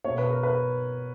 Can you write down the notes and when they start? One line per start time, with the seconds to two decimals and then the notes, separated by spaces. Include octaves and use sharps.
0.04 B2 C#5
0.18 B4
0.30 A#4
0.43 B4